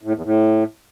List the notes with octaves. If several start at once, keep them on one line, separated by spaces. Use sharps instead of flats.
A2
E2
A2